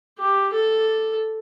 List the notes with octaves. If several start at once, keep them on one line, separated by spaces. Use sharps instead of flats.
G4
A4